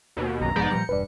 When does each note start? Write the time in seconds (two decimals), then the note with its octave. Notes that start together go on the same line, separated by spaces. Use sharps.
0.17 D#2 B2
0.42 B1 F#2 A#5
0.56 F1 G#2 F3 G#3 B3 D5 G6
0.71 A#2 F3 G3 C#7
0.89 E1 G2 B4 D5